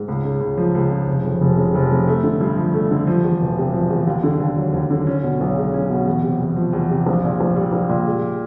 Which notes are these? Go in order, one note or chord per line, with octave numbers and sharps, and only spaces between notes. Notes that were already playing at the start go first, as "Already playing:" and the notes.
Already playing: G#2
C#2
C#3
C#2
F3
C#2
C#3
F1
F2
F1
C#3
F1
F2
A3
D3
G2
F3
A3
D3
F3
E2
E1
C3
F3
E2
D#2
D3
D#2
F#3
D#2
D3
C#4
B2
B1
G#3
C#4
B2
E2
C3
E2
F3
E2
C3
A#1
A#2
A#1
G3
A#1
A#2
G#3